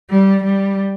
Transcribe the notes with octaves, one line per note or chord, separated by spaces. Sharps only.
G3
G3